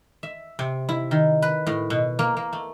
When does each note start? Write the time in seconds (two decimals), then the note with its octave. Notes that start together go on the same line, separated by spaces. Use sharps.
0.23 E5
0.59 C3
0.89 E4
1.11 D#3
1.42 B4
1.67 A2
1.90 B2
2.19 A#3
2.37 A#3
2.53 A3